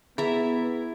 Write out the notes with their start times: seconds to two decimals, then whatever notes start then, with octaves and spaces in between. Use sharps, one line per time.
0.18 B3 E4 G#4 E5 A#5